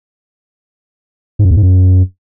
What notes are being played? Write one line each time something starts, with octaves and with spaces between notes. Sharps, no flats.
G#2
F#2
E2
G#2
F#2